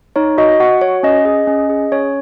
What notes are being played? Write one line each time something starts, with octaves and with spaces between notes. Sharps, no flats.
D#4 C#5
F#4 D#5
F#4 F#5
F#4 C#5
C#4 D#5
G#4 D#5
C#4
G#4
C#4 C#5